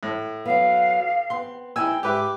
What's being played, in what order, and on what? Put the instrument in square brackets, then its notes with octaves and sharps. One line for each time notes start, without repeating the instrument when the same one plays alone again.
[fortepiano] A2
[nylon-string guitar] F#3 B3 [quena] F5
[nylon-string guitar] B3 C4 [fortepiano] C6
[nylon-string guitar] C4 D#4 E4 [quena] G5 [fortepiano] G#5 E6
[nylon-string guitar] G#2 [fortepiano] G4 B4 E5 [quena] D6